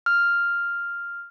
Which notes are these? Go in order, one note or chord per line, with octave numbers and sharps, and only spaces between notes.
F6